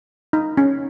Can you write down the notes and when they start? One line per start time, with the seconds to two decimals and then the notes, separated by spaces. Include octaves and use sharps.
0.33 D#4
0.57 C#4